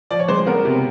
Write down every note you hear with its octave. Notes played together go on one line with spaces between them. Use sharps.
F3 D5
C#5
G#3 C5
B3 A#4
C3